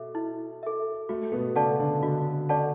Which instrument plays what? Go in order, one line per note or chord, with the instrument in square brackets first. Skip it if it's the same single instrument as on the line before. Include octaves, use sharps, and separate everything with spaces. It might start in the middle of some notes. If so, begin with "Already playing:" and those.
Already playing: [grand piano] B2 [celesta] A4 E5
[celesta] E4
A4 E5
[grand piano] A3 [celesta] F#4
[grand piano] B2 B3
[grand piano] C#3 C#4 [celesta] A4 D5 F#5 A5
[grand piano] D3 D4
[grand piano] D3 D4 [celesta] F#4
[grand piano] C#4 C#5 [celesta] A4 D5 F#5 A5